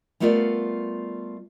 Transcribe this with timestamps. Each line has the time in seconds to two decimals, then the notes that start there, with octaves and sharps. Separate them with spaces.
0.20 G3 A3 B3 F4 A#4 D5